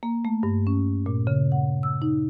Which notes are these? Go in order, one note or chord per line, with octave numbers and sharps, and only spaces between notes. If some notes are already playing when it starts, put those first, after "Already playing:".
A#3
A3
G2
C#4
A#2
C#3
F#5
E6
D#4